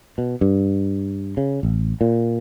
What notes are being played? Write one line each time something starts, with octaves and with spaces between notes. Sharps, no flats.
B2
G2
C#3
A1
A#2